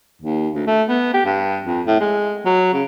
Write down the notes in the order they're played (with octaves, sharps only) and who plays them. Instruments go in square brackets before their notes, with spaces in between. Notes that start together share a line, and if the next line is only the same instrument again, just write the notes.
[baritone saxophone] D#2
D2
A3
B3
G4
G2
F2
A2
G#3
F#3
C#3